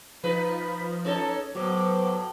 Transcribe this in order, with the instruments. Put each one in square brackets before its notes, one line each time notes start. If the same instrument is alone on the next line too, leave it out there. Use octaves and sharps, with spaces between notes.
[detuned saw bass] F3 [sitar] D#4 B4 [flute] B5
[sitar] C#4 D#4 A4 [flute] C#5
[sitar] A2 [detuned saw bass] F#3 [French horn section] B3 B4 C5 [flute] D6